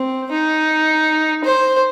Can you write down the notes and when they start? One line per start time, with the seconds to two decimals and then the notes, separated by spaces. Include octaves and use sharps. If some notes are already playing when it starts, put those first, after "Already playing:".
Already playing: C4
0.31 D#4
1.45 C5